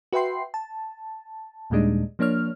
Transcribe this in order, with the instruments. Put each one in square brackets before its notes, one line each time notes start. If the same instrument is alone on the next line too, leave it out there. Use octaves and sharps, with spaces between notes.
[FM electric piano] F#4 B4 E5 G5 C6 C7
A5
D#2 A#2 G3 G#3 D4 D#4
F3 A#3 D4 C#5 F6